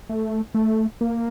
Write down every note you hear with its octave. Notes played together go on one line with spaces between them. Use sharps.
A3
A3
A#3